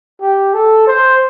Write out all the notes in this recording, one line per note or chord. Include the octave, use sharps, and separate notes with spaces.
G4
A4
C5